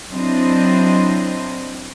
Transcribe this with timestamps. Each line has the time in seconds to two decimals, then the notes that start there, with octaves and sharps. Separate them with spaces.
0.11 F#3 C4 D4 E4 C5 D#5